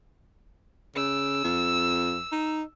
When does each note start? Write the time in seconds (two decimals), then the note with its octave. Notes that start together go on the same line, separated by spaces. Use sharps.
0.96 C#3 E6
1.44 F2
2.32 D#4